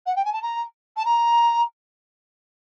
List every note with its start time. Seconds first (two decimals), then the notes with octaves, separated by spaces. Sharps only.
0.06 F#5
0.16 G5
0.25 G#5
0.33 A5
0.42 A#5
0.96 A5
1.05 A#5